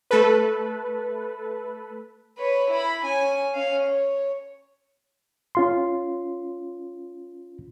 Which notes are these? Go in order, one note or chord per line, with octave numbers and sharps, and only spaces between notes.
A3 A4 B4
B4 C#5
E4 B5
C#4 G#5
C#4 F5
C#5
C#4 F4 C6